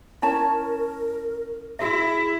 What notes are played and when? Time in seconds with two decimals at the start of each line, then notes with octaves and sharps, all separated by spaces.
0.22 C#4 E4 A#4 C#5 A5
1.79 E4 F#4 G#4 E5